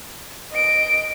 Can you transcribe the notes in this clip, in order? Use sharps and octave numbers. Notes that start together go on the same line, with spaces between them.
D#5 D7